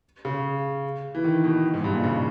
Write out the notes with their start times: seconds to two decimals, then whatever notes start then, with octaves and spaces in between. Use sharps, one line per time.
0.25 C#3
1.15 E3
1.24 D#3
1.44 B2
1.74 G#2
1.84 G2
1.94 A#2
2.04 C#3